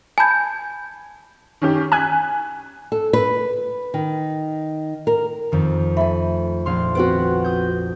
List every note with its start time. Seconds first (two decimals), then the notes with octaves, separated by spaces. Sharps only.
0.18 G#5 A5 B5 G6 G#6
1.62 D#3 C#4 G4
1.92 G#5 F#6 B6
2.92 A4
3.13 B4
3.94 D#3
5.07 A#4
5.52 F2 D#3
5.97 A3 G#5 B5
6.66 A#1 F5 C6
6.95 B3 C4 F#4 D7
7.44 D#6 G6